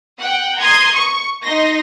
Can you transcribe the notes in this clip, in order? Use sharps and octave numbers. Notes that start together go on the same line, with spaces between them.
F#5 G5
A#5 C6 D#6 G#6
C#6
D#4 C6 A#6